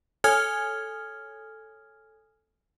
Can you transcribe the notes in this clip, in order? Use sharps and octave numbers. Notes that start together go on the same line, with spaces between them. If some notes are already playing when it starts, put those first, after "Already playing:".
A4 C#5 G#5 D#6 F6 G#6